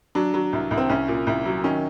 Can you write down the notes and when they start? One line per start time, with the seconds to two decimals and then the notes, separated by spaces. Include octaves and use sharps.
0.15 F#3 D4
0.34 F#3
0.53 C2
0.71 C2
0.77 C4
0.89 C2 C#4
1.08 A#2
1.27 C2
1.46 F#3
1.64 D#3 C#4